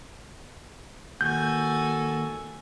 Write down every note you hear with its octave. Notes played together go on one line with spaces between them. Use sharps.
D#3 A#3 F#4 A4 G#5 G6